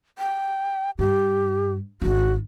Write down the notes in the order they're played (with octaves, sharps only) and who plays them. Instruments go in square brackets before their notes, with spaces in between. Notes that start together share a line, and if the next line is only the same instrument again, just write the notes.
[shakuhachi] G5
[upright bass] G2 [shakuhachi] G4
[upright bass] G#1 D4 [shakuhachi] F#4